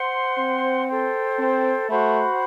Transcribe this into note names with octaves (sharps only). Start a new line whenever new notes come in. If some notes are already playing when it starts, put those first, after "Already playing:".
Already playing: C5 F#5 C6
C4
A4 C5 G5
C4
A3 F#4 C5 F#5 B5